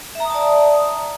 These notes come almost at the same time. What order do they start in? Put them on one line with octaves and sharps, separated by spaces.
E5 A#5 D#6 A5 D5